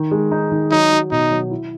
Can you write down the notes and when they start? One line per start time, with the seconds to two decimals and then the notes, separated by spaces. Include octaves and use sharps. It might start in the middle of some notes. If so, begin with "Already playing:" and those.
Already playing: D#3
0.11 G#3
0.31 D#4
0.52 D#3
0.71 F#3 D#4
0.92 F#3
1.11 B2 D#4
1.31 F#3
1.51 E4